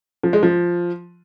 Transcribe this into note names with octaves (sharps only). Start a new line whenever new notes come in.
F3
G#3
F3